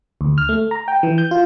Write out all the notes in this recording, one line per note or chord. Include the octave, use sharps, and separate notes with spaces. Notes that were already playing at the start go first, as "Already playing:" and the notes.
D2
F6
A3
A#5
G5
E3
G6
F4